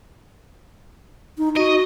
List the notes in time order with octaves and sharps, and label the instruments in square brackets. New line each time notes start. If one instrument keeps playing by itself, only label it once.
[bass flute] D#4
[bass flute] F#4 [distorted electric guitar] D#5